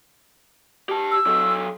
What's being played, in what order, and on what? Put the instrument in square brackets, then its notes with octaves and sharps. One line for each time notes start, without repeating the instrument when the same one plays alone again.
[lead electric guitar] G4 A5
[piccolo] E6
[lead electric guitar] F#3 A4